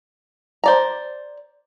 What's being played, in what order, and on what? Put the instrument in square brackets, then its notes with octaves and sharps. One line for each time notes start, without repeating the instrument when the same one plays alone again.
[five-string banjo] C5 D5 A#5